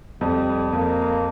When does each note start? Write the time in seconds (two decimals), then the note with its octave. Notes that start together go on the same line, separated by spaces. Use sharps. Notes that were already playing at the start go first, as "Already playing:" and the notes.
0.21 F2 G3
0.73 F2 A#3